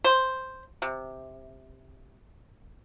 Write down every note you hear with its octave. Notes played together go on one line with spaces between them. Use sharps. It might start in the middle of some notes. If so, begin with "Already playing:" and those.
C5
C3